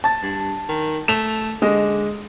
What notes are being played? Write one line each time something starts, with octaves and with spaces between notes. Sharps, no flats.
A5 A6
G2
D#3
A3 E7 F7
D3 G#3 D#5